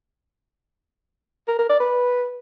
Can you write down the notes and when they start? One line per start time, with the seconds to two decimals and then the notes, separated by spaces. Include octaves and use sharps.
1.48 A#4
1.59 A#4
1.69 D5
1.80 B4